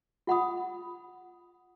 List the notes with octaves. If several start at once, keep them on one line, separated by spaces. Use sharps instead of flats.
F4 F#5 B5 D#6